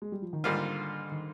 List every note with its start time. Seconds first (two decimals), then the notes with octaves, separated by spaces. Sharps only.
0.02 G#3
0.12 G3
0.22 F3
0.33 D#3
0.43 G#2 D3 G3 A#3 F4
1.12 D#3